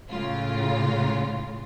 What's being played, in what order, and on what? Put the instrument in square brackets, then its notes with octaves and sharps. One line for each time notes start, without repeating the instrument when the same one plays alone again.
[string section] A2 C#3 F4